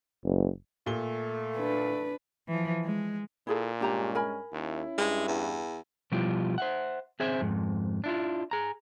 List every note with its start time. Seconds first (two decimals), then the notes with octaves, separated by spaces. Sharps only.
0.24 F#1
0.86 A#2 A3 G7
1.58 D4 B4
2.48 E3 F3
2.84 G#3
3.47 A#2 E4 G#4 A4
3.81 G2 G#3 C#4 D4 G4 A#5
4.15 A#4 G#5 B5
4.53 D#2 C#4 E4
4.98 G2 G#3
5.28 E2
6.12 B2 F3 G3 E4 F4 G4
6.58 C5 E5 F#5
7.20 C4 G#4 C5 E5 G#5
7.41 F2 G#2
8.04 D4 E4 F4
8.51 G#4 A#5